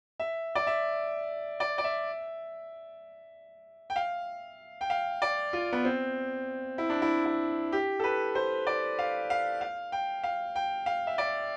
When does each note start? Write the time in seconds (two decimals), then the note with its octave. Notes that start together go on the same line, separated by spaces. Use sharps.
0.20 E5
0.55 D5
0.67 E5
1.60 D5
1.78 D5
1.84 E5
3.90 G5
3.96 F5
4.81 G5
4.90 F5
5.22 D5
5.53 F4
5.73 B3
5.85 C4
6.78 E4
6.90 D4
7.02 E4
7.25 E4
7.72 G4
7.99 A4
8.04 B4
8.35 C5
8.67 D5
8.99 F5
9.30 F5
9.61 F5
9.92 G5
10.23 F5
10.56 G5
10.86 F5
11.07 E5
11.18 D5